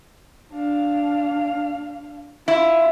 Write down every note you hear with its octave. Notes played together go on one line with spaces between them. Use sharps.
D4 F5
E4 F4